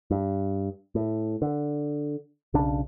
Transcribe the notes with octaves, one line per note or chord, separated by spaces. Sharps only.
G2
A2
D3
B1 C#3 D4